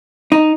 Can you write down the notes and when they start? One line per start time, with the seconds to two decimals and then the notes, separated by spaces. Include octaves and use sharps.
0.32 D#4